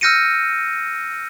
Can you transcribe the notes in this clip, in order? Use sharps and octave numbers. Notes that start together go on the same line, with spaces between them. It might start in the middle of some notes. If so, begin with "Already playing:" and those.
E6 F6 G6 A#6 C#7 D#7